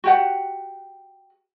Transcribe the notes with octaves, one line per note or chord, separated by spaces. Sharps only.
F#4 G4 F#5